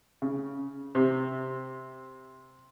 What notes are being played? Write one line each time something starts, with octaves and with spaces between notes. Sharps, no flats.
C#3
C3